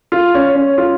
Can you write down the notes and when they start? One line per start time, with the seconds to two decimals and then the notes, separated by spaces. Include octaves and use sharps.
0.12 F4
0.35 C#4
0.55 C#4
0.78 F4